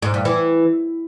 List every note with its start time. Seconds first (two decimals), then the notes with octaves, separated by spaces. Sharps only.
0.02 G#2
0.14 G2
0.25 E3